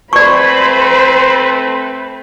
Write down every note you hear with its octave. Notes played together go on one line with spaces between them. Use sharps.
A3 C4 B4 C5 D5 B5 C#6